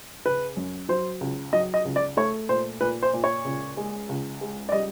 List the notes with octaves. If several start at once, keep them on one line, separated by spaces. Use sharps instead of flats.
C#3 B4
F#2
F#3 C5
C#2
F#3 D#5
D#5
C#2
D5
A3 C#5
A#2 C5
A#2 B4
C5
A#2
C#5
C#2
G#3
C#2
G#3
D5
G3 D#5